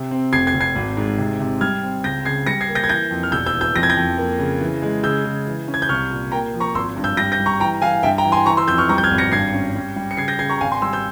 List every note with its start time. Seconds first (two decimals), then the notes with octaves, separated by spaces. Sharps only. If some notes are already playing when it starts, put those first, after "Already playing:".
Already playing: C3
0.11 C4
0.33 F1 G#6 C7
0.47 G#6 C7
0.54 F1
0.61 G#6 C7
0.75 G#1
0.97 G#2
1.18 C3
1.40 C3
1.61 G3 F6 G#6
1.83 C4
2.04 C#2 G6 A#6
2.25 C#3 G#6 C7
2.47 G3 A#6 C#7
2.61 G#6 C7
2.69 A#3
2.75 G6 A#6
2.84 G#6
2.89 E3 G6 A#6
3.11 F2
3.23 F6
3.32 E1 E6 G6
3.46 E6 G6
3.54 E3
3.61 E6 G6
3.75 F2 A#6
3.83 G#6
3.90 G6 A#6
3.97 F2
4.18 A#3
4.39 C#3
4.61 E3
4.82 G#3
5.03 C#3 E6 G6
5.25 C#3
5.47 E3
5.68 C#4
5.74 G#6
5.82 G6
5.89 C2 C#6 F6
6.11 A#2
6.32 A#3 G5 A#5
6.54 F3
6.60 A#5 C#6
6.75 G#1 C6 E6
6.97 G2
7.04 E6 G6
7.17 G3 G6 A#6
7.32 G6 A#6
7.40 G3
7.46 A#5 C#6
7.60 E3 G5 A#5
7.82 E3 F5 G#5
8.03 G2 E5 G5
8.18 G5 A#5
8.25 E3
8.32 G#5 C6
8.46 E3 A#5 C#6
8.57 C6 E6
8.68 F2 E6 G6
8.78 C#6 F6
8.89 G3 A#5 C#6
8.98 G6
9.03 F6 G#6
9.11 G#1
9.18 A#6 C#7
9.32 G2 G#6 C7
9.53 C#4
9.76 G3
9.96 G3
10.11 C#7
10.17 C#3 G#6 C7
10.28 G6 A#6
10.39 C#3 G#6 C7
10.49 A#5 C#6
10.61 G#1 F5 G#5
10.72 G#5 C6
10.82 G3 C6 E6
10.93 E6 G6